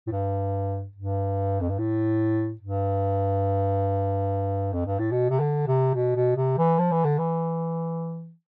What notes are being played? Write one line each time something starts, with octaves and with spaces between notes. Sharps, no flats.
A2
G2
G2
F2
G2
A2
G2
F2
G2
A2
B2
C3
D3
C3
B2
B2
C3
E3
F3
E3
D3
E3